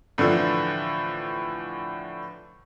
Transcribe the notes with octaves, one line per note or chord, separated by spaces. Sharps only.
A2 D3 E3 F3